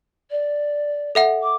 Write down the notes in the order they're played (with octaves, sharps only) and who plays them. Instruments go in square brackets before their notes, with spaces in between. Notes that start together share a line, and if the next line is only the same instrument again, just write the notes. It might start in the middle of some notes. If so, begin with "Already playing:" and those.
[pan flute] D5
[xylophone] A4 E5 F#5
[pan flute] D6